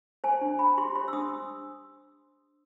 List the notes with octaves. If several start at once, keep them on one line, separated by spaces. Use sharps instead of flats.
C5 G#5
D4
D4 B5
G4 C6
C5 C6
E6
D4 D#6